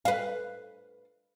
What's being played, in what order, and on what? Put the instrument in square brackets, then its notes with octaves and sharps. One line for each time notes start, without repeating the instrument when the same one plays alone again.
[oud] B4 F5